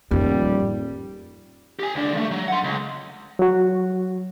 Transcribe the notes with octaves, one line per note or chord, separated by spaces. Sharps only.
D#1 F2 A2 G3
G4 G#5
C#2 D4
F3 A3
F#3
F#5 C6
C#2
F#3 F#4